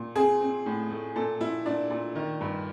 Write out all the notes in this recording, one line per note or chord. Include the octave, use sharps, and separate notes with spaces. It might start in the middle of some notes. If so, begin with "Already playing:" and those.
Already playing: A#2
C4 G#4
C4
A2
A3
A#2 A4
A#2 E4
A#2 D4
A#2
D#3
G2